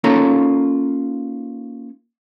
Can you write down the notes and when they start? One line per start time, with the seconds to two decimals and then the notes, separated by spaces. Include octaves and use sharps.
0.04 A#3 C#4 D#4 F4 A4 A#5